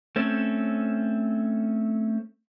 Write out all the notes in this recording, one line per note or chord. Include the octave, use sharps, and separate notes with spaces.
A3 C4 C#4